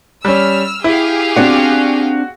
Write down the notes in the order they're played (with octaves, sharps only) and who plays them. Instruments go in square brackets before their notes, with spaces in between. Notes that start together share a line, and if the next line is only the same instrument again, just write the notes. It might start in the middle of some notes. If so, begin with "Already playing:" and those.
[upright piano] G3 C#4 [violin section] E6 F6
[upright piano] E4 [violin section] G4 G#4 F5
[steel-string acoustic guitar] C4 D4 D5 [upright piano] F#4